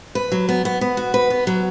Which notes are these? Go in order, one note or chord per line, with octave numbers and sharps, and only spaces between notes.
B4
F#3
B3
B3
B3
F#4
B4
B3
F#3